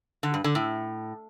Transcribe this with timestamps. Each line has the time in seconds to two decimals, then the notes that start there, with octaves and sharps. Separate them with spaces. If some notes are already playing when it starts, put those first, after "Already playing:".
0.23 D3
0.34 G2
0.44 D3
0.55 A2